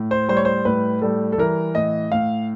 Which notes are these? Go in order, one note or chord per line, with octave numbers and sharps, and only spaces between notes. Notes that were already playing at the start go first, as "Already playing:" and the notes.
Already playing: A2
C5
G3 C5
C#5
C5
A2 B4
G3 A4
A4
E3 A#4
A2 D#5
A2 F5